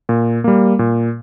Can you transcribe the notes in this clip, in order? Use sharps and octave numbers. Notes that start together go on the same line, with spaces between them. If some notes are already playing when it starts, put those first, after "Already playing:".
A#2
G3 A#3
A#2